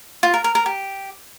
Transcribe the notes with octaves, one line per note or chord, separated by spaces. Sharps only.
F4
A#4
A#4
A#4
G4